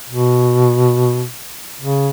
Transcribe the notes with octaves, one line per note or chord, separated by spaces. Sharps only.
B2
C#3